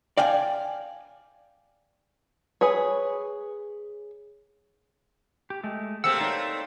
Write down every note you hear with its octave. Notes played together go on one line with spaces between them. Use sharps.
D5 F5 G5 G#5
G#4 B4 C#5
G4
G#3 A3
A3 A#3 C4 G4 G#4 F#5 E6
D#4 C#5 D5